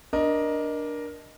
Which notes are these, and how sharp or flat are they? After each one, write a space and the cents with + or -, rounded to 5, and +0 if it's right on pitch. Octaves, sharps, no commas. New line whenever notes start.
D4 +0 A#4 +20 D#5 +0